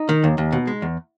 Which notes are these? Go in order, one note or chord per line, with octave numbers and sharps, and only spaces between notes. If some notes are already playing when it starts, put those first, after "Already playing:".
Already playing: D#4
D#3
D#2
D#2
B2
G#3
E2